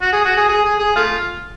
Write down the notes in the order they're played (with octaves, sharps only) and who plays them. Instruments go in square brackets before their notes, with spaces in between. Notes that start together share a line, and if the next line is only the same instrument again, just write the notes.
[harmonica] F#4
G#4
F#4
G#4
G#4
G#4
G#4
A3 F4